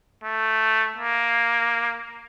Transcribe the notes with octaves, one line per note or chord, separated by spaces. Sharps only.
A3
A#3